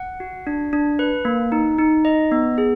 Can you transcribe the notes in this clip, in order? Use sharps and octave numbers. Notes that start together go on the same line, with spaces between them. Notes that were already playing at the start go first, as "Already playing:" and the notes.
Already playing: F#5
F#4
D4
D4
B4
A#3
D#4
D#4
D#5
B3
G#4